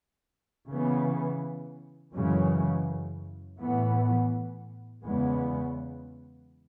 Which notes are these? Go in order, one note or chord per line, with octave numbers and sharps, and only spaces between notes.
C#3 E3 B3
F#2 C#3 E3 G#3
A2 E3 B3
E2 C#3 G#3 B3